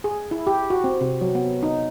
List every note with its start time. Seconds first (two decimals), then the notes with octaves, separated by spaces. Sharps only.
0.04 G#4
0.31 E4
0.47 G4
0.70 F#4
0.84 C4
1.01 C3
1.21 F#3
1.35 B3
1.63 D#4